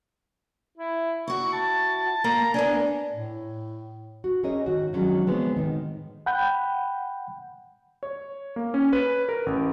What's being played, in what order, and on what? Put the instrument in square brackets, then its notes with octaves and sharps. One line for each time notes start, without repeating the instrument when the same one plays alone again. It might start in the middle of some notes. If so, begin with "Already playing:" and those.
[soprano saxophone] E4
[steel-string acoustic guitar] E4 F#4 [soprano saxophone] C#6
[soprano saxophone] A5
[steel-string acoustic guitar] A#3 [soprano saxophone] A#5
[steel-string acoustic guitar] A#3 B3 D4 [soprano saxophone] G#5
[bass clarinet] A2
[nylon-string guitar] F#4
C#4 G#4 A#4 C#5 D#5
G#2 D#3 F#4
D#3 F3 F#3 G#3 C#4 D4
F3 G#3 B3 C4
A2 D#3
[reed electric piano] F#5 G5 B5 G6
[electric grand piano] C#5
A#3
C#4
B4
A#4
A1